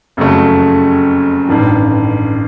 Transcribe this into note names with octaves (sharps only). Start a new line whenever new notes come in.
F#1 F2 C#3 F#3 A3
A1 G2 D#3